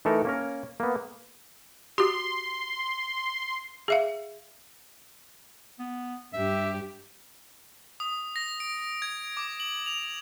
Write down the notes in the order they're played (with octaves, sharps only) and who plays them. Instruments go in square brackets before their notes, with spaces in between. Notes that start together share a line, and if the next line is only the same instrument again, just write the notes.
[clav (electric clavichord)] E3 A3 D#4 A4 A#4
A#3 C#4 A#4
A#3 B3
[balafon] F#4 G4 [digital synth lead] C6
[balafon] G#4 E5 F5
[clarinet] B3
[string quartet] G2 G4 [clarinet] E5
[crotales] D#6
A#6
D7
G#6
D6
F#7
F7